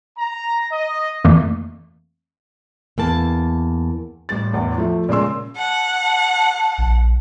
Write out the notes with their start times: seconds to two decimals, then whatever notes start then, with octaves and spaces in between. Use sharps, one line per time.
0.18 A#5
0.71 D#5
1.24 F2 E3 A3 A#3
2.98 E2 A#3 A5
4.29 A1 G3 A6
4.53 A1 E2
4.78 F3 A3
5.09 A#2 C#3 G#3 C6 E6
5.57 F#5 A5
6.78 A#1